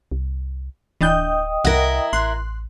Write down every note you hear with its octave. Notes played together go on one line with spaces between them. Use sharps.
C2
D1 E3 D4 D#5 G5 D#6 G6
C2 E4 A#4 F#5 A#6
A1 C6 F#6